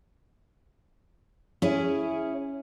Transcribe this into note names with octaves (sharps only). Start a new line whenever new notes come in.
C#4 E4 G#4